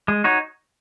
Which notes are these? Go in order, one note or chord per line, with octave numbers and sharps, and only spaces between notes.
G#3
D#4 F#4 C#5